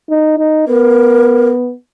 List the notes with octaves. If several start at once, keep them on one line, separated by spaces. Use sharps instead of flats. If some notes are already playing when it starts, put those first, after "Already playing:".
D#4
D#4
B3 A#4